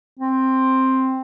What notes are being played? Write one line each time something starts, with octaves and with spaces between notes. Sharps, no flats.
C4